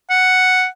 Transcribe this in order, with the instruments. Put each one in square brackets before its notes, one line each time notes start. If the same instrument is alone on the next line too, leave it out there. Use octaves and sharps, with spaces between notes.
[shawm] F#5